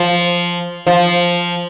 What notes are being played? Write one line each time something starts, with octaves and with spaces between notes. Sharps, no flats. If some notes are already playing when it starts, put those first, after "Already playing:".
Already playing: F3
F3